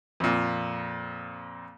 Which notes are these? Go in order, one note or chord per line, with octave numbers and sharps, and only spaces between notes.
F2 A#2